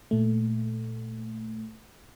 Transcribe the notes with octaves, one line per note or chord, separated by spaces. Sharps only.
A#2 A3